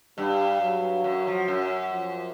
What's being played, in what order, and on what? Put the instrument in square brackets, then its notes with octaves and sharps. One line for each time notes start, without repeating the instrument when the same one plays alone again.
[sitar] G2 [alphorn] G3
[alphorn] F#3
[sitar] F#2
F3
F#2
[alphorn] F3